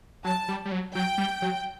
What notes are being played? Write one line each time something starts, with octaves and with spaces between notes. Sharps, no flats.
F#3 A5
G3
G3
F#3
F#3 G5
G3
F#3